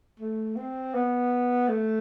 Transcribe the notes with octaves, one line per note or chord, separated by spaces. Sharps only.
A3
C4
B3
A3